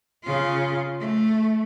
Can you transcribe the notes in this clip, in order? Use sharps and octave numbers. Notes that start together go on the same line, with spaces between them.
C#3 F4
A3